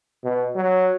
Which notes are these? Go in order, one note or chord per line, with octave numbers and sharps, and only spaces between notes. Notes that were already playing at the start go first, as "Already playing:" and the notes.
B2
F#3